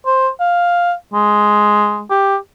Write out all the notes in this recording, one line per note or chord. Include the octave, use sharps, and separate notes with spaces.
C5
F5
G#3
G4